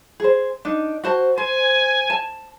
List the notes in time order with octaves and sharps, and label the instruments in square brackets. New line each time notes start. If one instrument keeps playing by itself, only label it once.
[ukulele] G#4 C5
D4 D#4
F#4 C5 A5
[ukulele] C5 [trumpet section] G#5
[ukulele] A5